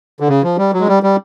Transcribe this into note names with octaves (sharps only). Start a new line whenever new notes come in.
D3
C#3
F3
G3
F#3
G#3
G3
G3